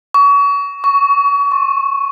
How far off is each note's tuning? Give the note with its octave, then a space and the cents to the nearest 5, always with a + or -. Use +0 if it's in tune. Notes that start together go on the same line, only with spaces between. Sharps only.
C#6 +35
C#6 +15
C#6 -40